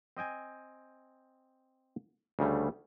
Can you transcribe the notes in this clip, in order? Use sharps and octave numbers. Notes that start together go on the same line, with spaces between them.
C4 D#5 G5 G#5
D2 C#3 G3 A3